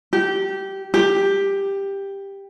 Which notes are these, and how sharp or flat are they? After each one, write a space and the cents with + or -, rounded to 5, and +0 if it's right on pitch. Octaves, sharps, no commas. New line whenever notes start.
G4 -15
G4 +10